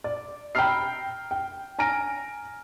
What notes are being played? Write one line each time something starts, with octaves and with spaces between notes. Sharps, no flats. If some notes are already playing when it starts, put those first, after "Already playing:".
D5
G5 A#5 B5 E6 F6 C7
G5
G#5 A#5 F6 A#6 D7